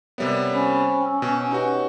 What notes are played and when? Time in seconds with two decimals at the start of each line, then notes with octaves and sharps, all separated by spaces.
0.18 C3 G3 B3 A#4 C#5 E5
0.52 C#4 C5 B5
1.01 G5 E6
1.22 B2
1.51 D#4 F#4 G4 B4 C#5